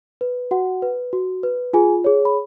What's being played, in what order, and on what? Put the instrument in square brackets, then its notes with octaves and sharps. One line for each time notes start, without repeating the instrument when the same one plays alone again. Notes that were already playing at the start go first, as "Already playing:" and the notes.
[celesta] B4
F#4 F#5
B4
F#4
B4
F4 G#4 G#5
G#4 C#5
B5